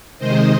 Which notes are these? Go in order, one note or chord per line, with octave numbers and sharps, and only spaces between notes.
C3 D#3 G#3 C5 D#5